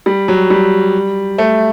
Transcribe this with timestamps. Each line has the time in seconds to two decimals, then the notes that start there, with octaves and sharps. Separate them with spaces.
0.06 G3
0.28 F#3
0.50 G3
1.38 A3